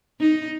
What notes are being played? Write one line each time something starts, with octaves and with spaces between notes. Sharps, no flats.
D#4